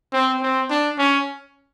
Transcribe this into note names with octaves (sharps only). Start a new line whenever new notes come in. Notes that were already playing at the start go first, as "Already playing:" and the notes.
C4
C4
D4
C#4